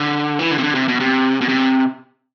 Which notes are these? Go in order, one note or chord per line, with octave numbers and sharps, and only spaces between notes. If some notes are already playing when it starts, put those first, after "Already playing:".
Already playing: D3
E3
D3
C3
D3
C3
B2
C3
B2
C3